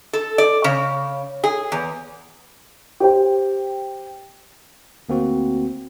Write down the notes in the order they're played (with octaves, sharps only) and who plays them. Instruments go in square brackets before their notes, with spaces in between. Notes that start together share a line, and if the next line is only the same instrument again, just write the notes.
[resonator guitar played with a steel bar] A4
D5
C#3
G#4
E2
[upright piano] G4 C5 G5
[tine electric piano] D2 A#3 C4 F#4